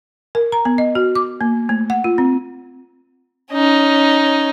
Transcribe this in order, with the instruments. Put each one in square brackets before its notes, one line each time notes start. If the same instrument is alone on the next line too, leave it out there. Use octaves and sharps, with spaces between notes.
[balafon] A#4
A#5
B3
D#5
F#4
D6
A#3
A3
F#5
F4
C4
[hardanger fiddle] C#4 D#4